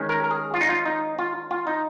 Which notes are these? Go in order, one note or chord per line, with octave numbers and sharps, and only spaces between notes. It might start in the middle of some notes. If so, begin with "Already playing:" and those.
Already playing: D#3 G#3 C#4
A#4
A#4
G#4
F4
D#4
F4
D#4
F4
F4
D#4